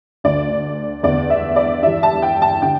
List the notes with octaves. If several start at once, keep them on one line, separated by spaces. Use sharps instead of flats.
D2 D3 D5
E2 D3 D5
E5
D5
G2 E3 E5
A5
G5
A5
D3 G5